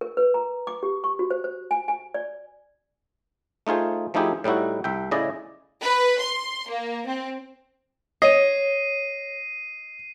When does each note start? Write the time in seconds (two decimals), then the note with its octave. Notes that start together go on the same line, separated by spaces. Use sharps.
0.01 A#4
0.17 B4
0.34 A#5
0.67 D6
0.83 G4
1.04 C#6
1.19 F#4
1.30 C5
1.44 C5
1.71 G#5
1.88 G#5
2.14 D5
3.67 A3 D#4 F4 G#4 C5
4.14 F3 A3 D#4 E4 G4 G#4
4.44 A2 G3 D#4 E4 F#4
4.84 C2 E5 G5
5.11 A2 C#3 E4 G#4 D5 D#5
5.81 B4
6.18 C6
6.68 A#3
7.06 C4
8.22 C#5 D#5 C7 D#7